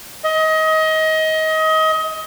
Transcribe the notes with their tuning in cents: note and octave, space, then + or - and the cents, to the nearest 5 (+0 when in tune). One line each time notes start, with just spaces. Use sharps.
D#5 +25